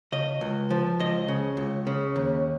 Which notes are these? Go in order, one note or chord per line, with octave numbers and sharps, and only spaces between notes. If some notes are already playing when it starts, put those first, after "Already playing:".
C#3 D#5
C#2
F3
C#2 D#5
C#3
C#2
C#3
D#2